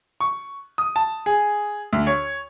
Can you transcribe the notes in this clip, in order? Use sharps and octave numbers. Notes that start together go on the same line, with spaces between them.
C#6
D#6
A5
G#4
D2
C#5